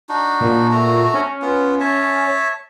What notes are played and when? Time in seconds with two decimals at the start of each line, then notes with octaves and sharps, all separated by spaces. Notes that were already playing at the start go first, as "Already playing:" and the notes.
0.09 D4 D#4 F#4
0.40 A#2
0.71 A3 F#4 A#5
1.14 C#4
1.42 B3 F4
1.80 C#5 E5 A5